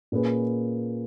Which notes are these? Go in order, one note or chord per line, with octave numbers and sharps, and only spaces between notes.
A#2 A#3 C#4 G#4 B4